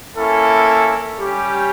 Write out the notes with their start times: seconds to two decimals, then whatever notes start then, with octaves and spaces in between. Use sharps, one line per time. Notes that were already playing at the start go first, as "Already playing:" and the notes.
0.16 A#3 C#4 E4 A4
1.18 G3 C#4 G4